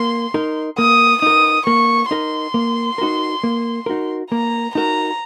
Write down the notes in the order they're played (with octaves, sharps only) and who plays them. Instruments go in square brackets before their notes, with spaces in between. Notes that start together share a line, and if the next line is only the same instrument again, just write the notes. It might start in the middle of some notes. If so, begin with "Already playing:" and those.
Already playing: [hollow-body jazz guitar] A#3 [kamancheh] C6
[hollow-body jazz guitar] D#4 A#4
[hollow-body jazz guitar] A#3 [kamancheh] D#6
[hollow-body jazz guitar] D#4 A#4 [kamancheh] D#6
[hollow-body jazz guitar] A#3 [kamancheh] C#6
[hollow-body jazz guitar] D#4 A#4 [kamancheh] C6
[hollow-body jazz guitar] A#3
D#4 F#4 A#4
A#3
D#4 F#4 A#4
[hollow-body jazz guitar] A#3 [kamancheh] A#5
[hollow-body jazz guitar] D#4 F#4 A#4 [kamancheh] A#5